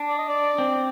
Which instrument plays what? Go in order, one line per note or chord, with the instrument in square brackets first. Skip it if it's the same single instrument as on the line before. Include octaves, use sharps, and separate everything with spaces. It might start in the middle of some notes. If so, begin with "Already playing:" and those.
Already playing: [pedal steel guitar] D4
[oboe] D5
D#5
D5
[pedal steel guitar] C4